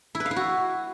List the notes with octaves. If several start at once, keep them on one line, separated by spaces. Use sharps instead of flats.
E4
B4
F5
E4
F#4